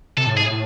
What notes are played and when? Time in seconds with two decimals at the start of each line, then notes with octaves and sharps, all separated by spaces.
0.17 C3 A4
0.27 A2
0.35 G#2 G#4
0.44 A2